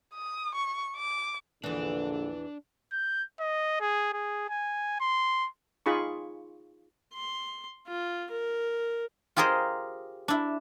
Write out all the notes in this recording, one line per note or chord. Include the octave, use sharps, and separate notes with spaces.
D#6
C#6
D6
A#1 E2 D3 E3 D4
G6
D#5
G#4
G#4
G#5
C6
D#4 F4 G#4 B5 C#6
C6
F4
A#4
F4 G4 G#4 A#4 C5 D#5
D4 E4